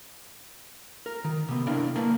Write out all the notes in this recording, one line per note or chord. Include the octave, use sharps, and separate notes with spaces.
A#4
D#3
C3 B3
D4 E4 A#4 F5 G5
A#3 A#4 B4 A5